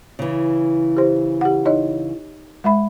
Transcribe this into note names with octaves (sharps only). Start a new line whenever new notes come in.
C#3 E3
G4 C5
G4 F#5
D#4 C#5 D#5
G#3 E5 B5